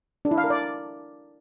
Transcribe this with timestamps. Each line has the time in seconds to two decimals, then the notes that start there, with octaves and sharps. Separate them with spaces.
0.25 D4
0.31 E4
0.38 F5
0.44 A#4
0.50 D5